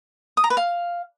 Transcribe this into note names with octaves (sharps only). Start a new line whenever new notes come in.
D#6
A#5
B4
F5